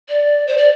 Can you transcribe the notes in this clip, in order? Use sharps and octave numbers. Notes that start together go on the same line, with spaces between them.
D5
C5
D5